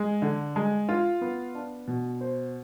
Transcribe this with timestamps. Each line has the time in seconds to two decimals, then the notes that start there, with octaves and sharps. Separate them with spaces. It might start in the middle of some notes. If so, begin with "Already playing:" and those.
Already playing: G#3
0.22 D3
0.56 G#3
0.89 F4
1.21 B3
1.55 D4
1.87 B2
2.21 C5